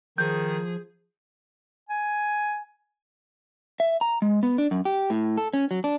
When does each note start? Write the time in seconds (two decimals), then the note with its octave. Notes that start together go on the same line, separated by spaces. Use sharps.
0.18 D#3 F3 G#4 G6
1.89 G#5
3.80 E5
4.01 A#5
4.22 G#3
4.43 B3
4.58 D4
4.71 F#2
4.85 G4
5.10 A2
5.38 A4
5.54 C#4
5.71 F#3
5.84 D4